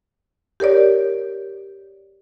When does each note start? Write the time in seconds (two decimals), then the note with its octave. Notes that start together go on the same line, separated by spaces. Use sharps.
0.60 G4 A#4 C#5 D5